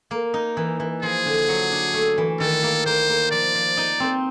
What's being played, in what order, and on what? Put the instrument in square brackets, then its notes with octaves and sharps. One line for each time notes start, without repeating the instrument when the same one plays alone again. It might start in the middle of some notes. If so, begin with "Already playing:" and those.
[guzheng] A#3
D#4
E3
E3
[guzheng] F3 [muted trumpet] G#4
[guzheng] D3
F#3
D4
A3
E3
[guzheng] D#3 [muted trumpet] A4
[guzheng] A#3
[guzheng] A#3 [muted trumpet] C5
[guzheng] A#3
[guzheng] F3 [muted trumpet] D5
[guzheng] F3
D#4
C4